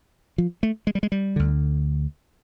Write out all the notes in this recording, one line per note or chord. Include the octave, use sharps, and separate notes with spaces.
F3
A3
G#3
G3
G#3
G3
D2 D3